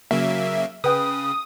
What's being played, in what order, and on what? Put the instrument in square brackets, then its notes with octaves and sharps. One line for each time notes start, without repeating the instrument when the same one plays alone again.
[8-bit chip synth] C#3 F#3 A#3 [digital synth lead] E5
[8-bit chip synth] C#3 [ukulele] B4 G5 [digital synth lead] D#6